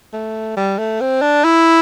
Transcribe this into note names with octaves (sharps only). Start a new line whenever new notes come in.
A3
G3
A3
C4
D4
E4